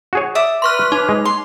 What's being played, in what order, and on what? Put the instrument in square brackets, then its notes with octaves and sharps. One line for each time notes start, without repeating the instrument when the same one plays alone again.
[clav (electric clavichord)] F#4 G#4 C#5
[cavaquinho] D5 E5 D#6
[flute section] B4 [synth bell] C6 C#6 F6
[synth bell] D#4
[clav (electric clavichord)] G#3
[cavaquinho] C6